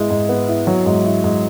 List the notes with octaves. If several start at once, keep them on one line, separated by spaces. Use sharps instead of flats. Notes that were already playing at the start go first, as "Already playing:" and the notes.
Already playing: G#2 G#3 B3 E4
G#2
B3
E4
F#3
G#2
E4
G#2